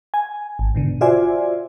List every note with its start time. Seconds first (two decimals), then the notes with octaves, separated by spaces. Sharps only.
0.14 G#5
0.59 G#1
0.74 G#2 B2 D3
1.01 F4 F#4 C5 D5 E5 G#5